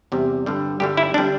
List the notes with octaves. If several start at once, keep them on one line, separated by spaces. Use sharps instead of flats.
E2 C3 G3
G2 D3 G3
G2 D3 G3 G4
E4
D3 G3 D4